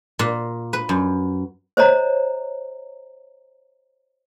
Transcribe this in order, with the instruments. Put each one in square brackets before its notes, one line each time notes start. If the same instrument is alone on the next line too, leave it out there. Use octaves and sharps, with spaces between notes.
[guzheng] A#2
B4
F#2
[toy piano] C5 C#5 D#5 A#5